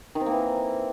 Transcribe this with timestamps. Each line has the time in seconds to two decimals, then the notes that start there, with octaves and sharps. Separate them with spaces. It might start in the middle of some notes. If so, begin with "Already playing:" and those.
0.15 D#3
0.21 C4
0.26 A#3
0.32 E3